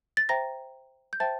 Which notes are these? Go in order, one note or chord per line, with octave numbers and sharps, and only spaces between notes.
A6
C5 E5 G5 A#5 A#6
G6
C5 E5 G5 A5 A6